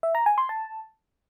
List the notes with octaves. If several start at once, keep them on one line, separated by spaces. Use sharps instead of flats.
E5
A#5
G#5
C6
A5